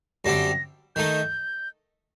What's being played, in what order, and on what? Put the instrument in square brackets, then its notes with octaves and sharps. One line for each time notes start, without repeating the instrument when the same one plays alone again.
[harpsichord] F#2 D3 G3 C4 [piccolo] A#6
[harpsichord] D#3 A3 D#4 [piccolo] G6